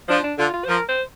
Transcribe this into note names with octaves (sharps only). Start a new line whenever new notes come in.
F3 D4
D4
D3 F4
F4
C5
F3 A#4
C5